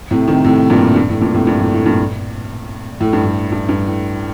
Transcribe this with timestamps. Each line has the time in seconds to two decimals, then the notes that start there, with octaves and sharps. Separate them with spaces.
0.11 A2 C3
0.28 C3 D#3
0.45 A2 C3
0.70 G2 A#2
0.96 G2
1.09 A2
1.21 G2 A#2
1.35 A2 C3
1.47 G2 A#2
1.60 A2
1.73 A2
1.86 G2 A#2
3.01 A2
3.13 G2
3.25 A2
3.52 G2
3.69 G2
3.86 A2